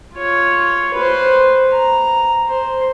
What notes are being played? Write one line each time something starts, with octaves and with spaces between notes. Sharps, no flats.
F4 C#5
B4 C5
A#5
C5